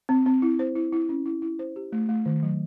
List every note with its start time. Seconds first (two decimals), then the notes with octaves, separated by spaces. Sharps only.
0.09 C4
0.26 C4
0.42 E4
0.59 C5
0.76 E4
0.93 E4
1.09 C#4
1.26 E4
1.42 E4
1.59 C5
1.76 G4
1.92 A3
2.09 A3
2.26 D#3
2.43 F#3